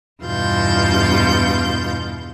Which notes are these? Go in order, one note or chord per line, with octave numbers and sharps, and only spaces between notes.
E2 G2 B2 F4 G6 A6